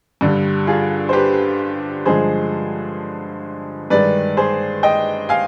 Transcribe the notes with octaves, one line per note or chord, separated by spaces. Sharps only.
G2 D3 G3
F4 G#4
C5
G4 B4
G2 D3 F3 G#3 G#4 C5
G2 D#3 G#3 B4 D5
G#4 C5
D#5 G5
F5 G#5